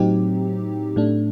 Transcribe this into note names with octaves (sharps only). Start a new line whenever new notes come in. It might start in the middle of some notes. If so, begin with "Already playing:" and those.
Already playing: A2 F#3 C4 D#4 G4
A2 A3 D4